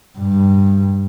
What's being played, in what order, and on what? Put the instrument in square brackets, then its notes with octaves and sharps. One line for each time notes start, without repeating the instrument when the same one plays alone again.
[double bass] G2